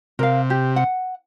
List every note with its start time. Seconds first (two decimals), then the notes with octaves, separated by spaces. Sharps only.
0.19 C3 A#4 F5
0.50 G4
0.76 F#5